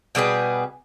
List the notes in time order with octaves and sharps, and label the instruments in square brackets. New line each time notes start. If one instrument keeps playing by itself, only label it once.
[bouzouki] B2 G3 G#4 B4